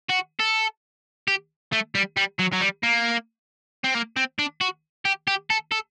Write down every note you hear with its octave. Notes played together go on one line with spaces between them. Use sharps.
F#4
A4
G4
A3
G3
G3
F#3
F#3
G3
A#3
C4
A#3
C4
D4
F#4
G4
G4
A4
A4